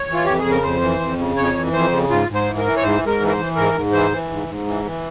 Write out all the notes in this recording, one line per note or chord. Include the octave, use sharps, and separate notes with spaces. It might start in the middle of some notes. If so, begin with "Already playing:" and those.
Already playing: C#5
E3 F4
F2 G4
G#4
C#3
A#4
F2 C5
E3
F2
C#3
F2 C#5
E3
F2 C5
C#3
G#2 F4
G#2
C5
E3
A#4
E3
C#5
G#2 C5
G#2
A#4
E3
A#4
C5
E3
G#2 A#4
G#2
E3 C5
E3
G#2
G#2
E3
E3